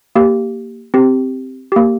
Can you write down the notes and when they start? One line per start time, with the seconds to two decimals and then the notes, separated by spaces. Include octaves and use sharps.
0.15 A#3 G4
0.94 C4 G4
1.72 A#3 G4